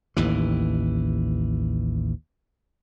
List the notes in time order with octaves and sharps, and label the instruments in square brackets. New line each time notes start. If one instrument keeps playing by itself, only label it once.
[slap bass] A1 D#2 E3